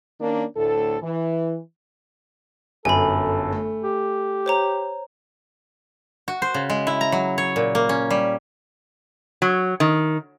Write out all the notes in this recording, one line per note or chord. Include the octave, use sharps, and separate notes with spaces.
D#3 A#3 C#4 D4
D2 A2 A4
E3
G1 F#2 A4 G#5 B5
A3
G4
C5 C#5 A#5
F#4
C5
C#3
G#3
E4
A#5
F#3
C#5
A#2
A#3
C#4
G3
F#3
D#3